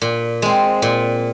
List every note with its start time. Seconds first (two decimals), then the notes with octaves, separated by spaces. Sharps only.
0.02 A#2
0.42 G#3 C4
0.82 A#2